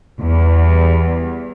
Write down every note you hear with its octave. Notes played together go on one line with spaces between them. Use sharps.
E2 G3